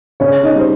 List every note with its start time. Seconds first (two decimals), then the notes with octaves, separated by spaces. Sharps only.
0.20 C#3 C#4 C#5
0.43 D#4 D#5
0.55 G3 C5